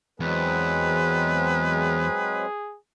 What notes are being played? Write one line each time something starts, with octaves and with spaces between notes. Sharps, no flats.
E2 F#3 G#3 C4 G#4 B4